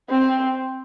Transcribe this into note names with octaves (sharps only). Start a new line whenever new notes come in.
C4